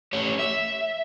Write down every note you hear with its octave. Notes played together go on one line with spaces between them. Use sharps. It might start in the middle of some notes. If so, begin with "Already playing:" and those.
A3 G4 C#5
E5